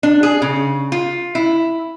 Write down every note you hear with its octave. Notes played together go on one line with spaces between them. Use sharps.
D4
G#4
C#3
F4
E4